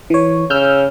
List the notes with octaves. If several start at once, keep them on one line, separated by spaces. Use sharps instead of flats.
E3 C#5
C#3 E6 F6 G6